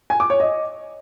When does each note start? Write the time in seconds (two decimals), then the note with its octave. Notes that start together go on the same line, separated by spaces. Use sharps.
0.10 G#5
0.20 D6
0.30 C#5
0.40 D#5